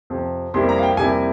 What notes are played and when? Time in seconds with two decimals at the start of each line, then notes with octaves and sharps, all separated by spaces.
0.10 F2 C3 F3
0.54 F2 C3 G3 A#3 E4 C6
0.69 A#5
0.78 F5
0.83 G5
0.97 F2 C3 G3 A#3 E4 G#5